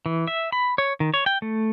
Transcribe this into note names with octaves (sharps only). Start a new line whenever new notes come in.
E3
E5
B5
C#5
D#3
C#5
G5
A3